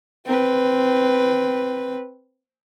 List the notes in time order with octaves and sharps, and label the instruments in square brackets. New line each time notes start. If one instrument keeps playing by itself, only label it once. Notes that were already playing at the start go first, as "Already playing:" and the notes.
[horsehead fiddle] C4 B4